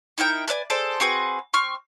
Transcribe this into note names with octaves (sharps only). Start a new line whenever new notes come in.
D#4 E4 A#4 G5
A4 B4 D5 G#5
G#4 A4 C5 D5
C4 F#4 G#4 B4
C4 C#6 F6